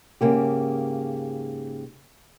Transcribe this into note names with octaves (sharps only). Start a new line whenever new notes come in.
G#2 C#3 A#3 G4